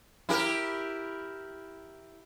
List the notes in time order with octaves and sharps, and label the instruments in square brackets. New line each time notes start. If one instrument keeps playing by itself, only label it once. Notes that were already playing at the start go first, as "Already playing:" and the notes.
[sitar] E4 G4 A#4